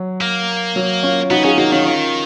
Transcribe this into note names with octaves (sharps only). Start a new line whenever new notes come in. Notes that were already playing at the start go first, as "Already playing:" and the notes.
Already playing: F#3
A#3
F#3
C#4 F4
B3 D#4 F#4
C#4 F4 G#4
A#3 D#4 F#4
D#3 C#4 F4
C#4 F4